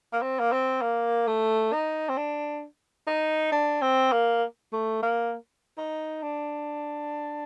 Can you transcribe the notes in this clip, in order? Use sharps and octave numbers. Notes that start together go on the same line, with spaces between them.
A#3
C4
A#3
C4
A#3
A3
D#4
C4
D4
D#4
D4
C4
A#3
A3
A#3
D#4
D4